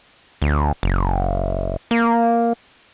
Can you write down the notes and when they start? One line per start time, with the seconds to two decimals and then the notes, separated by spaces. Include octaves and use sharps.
0.42 D2
0.83 F#1
1.91 A#3